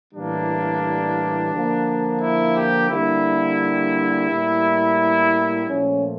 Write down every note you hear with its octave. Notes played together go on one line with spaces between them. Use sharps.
A2 E3 G3 A#3 D4
D3 F3 A#3
E4
G4
D3 G3 A#3 E4
A2 G3 A#3
A#2 F3 A3 C#4